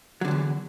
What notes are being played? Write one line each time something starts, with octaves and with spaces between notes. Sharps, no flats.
E2 A2 D3 F#3